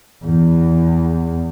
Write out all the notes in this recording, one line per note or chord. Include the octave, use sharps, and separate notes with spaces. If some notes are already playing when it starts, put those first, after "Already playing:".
E2